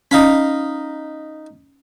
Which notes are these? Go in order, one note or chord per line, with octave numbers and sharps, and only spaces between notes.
C#4 D#4 F5 B5